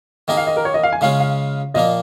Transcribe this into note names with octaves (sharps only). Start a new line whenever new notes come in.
D#3 A#3 D#4 G#4 D#5
F5
D#5
A#4
C#5
D#5
F5
G#5
C#3 G#3 C#4 F4 F5
F5
A#2 F3 A#3 F4 D#5